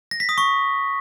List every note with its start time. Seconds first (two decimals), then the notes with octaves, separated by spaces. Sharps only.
0.11 A#6
0.20 B6
0.29 D#6
0.38 C#6